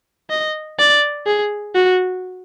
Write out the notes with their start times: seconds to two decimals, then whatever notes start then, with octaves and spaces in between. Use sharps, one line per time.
0.30 D#5
0.79 D5
1.26 G#4
1.75 F#4